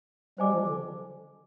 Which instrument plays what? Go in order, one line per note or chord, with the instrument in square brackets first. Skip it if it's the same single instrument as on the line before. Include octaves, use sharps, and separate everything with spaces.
[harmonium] G3 [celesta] C5 D#5 G#5 D6
[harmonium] F3
D3